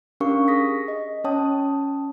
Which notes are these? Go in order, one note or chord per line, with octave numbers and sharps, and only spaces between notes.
C#4 D4 G4 A#4 F5 C#6
G#4 D#6 A#6 B6
D#5
C#4 C#5 G5 A5 D#6